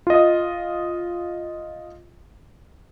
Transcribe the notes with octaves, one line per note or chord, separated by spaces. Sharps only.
F4 D#5